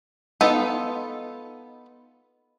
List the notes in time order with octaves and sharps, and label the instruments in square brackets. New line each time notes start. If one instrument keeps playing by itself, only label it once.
[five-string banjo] B3 D#4 F4 A4